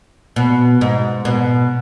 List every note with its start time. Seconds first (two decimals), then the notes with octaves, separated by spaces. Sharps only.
0.36 B2
0.81 G#2
1.25 B2